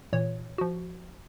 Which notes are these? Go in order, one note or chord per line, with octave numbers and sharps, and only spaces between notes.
A#2 E3 C#5
F3 F#4